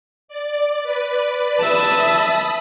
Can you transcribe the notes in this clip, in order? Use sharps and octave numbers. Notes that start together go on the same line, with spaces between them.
D5
B4 D5
E5 A5 B5 D#6